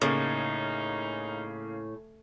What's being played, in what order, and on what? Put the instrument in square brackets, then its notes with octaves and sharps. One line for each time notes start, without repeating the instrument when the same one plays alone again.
[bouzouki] A2 [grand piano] C#3 A#3 [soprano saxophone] D#4